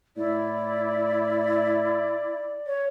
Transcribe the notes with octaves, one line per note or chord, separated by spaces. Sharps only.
A2 E4 D5
C#5